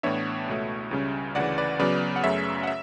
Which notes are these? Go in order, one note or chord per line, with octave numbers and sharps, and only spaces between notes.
A2 E3 B3 D4 C#5 E5
C#2 B2 A3
C#2 C#3 G3 C#4
D2 C#3 E3 D5 F#5
B4 D5
C#3 F#3 B3 B4 D5
F#5
F#2 C#3 F#3 A3 C#4 C#5 E5
F#5
E5